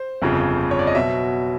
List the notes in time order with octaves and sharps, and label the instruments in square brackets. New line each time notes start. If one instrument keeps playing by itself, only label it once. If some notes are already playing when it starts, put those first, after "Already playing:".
Already playing: [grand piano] C5
G1 F2 C#3 F3
C#5
D5
D#5
B2 F#3 E5